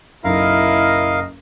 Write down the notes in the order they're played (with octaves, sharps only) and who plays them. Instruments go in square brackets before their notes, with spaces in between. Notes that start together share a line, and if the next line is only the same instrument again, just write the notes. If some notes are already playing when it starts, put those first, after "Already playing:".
[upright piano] F#1 B1 [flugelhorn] E4 [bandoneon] A#4 F5 [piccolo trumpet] D#5